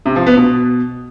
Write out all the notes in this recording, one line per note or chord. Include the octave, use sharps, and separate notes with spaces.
C3
F3
B3
B2